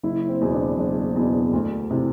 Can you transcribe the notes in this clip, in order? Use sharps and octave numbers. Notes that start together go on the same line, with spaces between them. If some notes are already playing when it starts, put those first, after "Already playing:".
F#1 E4
C4
E2 B2
D4
F#1 D4
E2 B2
D2
C3 E3